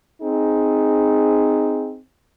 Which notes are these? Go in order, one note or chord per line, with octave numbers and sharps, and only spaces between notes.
C4 D#4 G#4